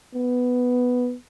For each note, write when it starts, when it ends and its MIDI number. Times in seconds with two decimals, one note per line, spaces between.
0.15 1.15 59